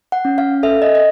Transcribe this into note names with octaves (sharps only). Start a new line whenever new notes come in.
F#5
C#4
F5
A4 E5
D#5
D#5